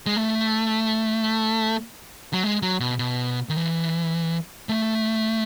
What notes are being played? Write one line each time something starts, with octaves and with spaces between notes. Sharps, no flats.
G#3
A3
F#3
G#3
F#3
B2
B2
D#3
E3
A3